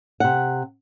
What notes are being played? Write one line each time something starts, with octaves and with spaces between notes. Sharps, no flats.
C3 F#5